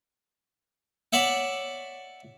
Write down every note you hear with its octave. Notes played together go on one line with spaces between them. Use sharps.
C#5 D5 E5 F#5